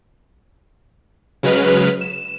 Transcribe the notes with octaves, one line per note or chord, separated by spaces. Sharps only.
C#3 F#3 G#3 B4 F6
E7